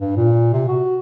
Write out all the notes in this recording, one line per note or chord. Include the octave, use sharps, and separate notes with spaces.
G2
A#2
C3
F#4